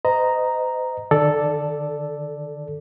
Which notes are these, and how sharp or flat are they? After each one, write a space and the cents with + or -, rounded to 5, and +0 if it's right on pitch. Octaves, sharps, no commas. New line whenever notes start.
C5 -40 D#5 +0 A#5 +0
D#3 -45 A4 +0 D5 +0